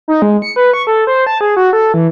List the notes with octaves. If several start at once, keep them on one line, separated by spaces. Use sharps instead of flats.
D#4
G#3
C#7
B4
C#6
A4
C5
A5
G#4
F#4
A4
E3